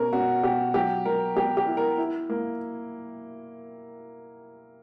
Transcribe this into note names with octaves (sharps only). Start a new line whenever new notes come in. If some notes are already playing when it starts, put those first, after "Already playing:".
Already playing: B2 C#4 A#4
C#4 F#4
B2 G4
F#3 G4
F#3 A#4
B3 G4
G4
E4
A#4
E4
A#3